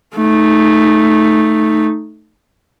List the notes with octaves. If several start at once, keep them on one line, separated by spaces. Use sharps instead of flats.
A3 D#4